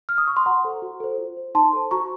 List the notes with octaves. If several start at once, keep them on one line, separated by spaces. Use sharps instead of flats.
F6
D#6
C#6
C6
F#4 F#5 A#5
A4 C5
F#4
A4 C5
F4
C5
D#4 A5 C6
A4 C5
F#4 A#5 C#6